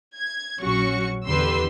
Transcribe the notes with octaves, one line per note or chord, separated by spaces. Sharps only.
G#6
A#1 F#3 C#4 F#4 C#6 C#7
E2 D3 G4 B4 C6 E6